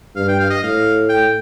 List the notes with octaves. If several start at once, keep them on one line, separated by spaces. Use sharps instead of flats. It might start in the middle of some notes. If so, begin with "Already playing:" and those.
G2 F5
G5
F5
D#5
A2 F5
G5